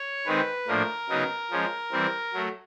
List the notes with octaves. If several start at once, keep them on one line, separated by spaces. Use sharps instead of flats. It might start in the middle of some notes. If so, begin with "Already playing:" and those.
Already playing: C#5
D#3 G#3 C4 D#4 B4
A2 F3 A#3 D4 A#4
C#3 F#3 B3 D#4
F3 G#3 C#4
E3 G3 C4
F#3 A3